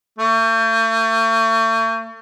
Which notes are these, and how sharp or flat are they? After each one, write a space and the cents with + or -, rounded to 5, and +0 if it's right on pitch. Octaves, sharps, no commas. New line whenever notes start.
A3 +40